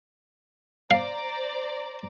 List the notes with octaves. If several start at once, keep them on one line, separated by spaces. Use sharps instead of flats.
C5 D5 F5 A#5